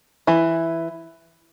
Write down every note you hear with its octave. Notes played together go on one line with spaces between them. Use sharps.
E3 E4